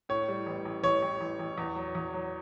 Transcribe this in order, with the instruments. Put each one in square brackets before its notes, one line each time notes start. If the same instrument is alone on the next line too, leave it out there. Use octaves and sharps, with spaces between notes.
[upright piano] A2 [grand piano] C#5
[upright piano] G3
A1
A1
[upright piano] A1 [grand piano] C#5
[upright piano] A1
A1
A1
E2
F#3
E2
F#3